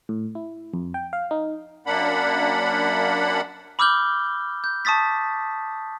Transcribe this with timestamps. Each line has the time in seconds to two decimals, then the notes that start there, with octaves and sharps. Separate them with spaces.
0.09 A2
0.35 E4
0.74 F2
0.94 G5
1.13 F5
1.31 D#4
1.86 F#2 A#3 D4 F#5 B5
3.79 B5 D6 E6 F6 G6 G7
4.64 G6
4.85 A5 C#6 D#6 A6 B6